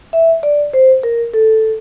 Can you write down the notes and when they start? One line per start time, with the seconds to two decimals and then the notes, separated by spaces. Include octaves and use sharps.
0.13 E5
0.43 D5
0.73 C5
1.03 A#4
1.34 A4